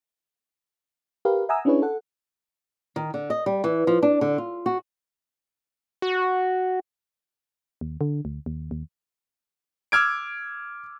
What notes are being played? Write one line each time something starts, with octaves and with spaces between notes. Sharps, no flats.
G4 A#4 B4 F5
E5 F#5 G#5 A#5 D#6 E6
C#4 D4 E4 G#4 B4 C#5
A4 F#5
D#3
D3
D#5
G3
E3
F3
D4
D3
F4
F#4
F#4
D#2
D3
D2
D#2
D#2
D6 E6 F6 G#6 D7